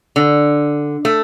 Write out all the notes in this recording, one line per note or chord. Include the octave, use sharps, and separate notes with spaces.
D3
A3